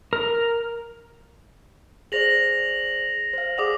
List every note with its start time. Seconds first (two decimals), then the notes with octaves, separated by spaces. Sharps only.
0.13 A#4
2.12 G#4 C5 D5 A#6 F7 F#7
3.33 C5 F5
3.58 G#4 D5 F#5 D6 D#6 F7